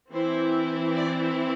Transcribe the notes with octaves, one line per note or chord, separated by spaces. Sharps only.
E3 C4 E4 C5
D5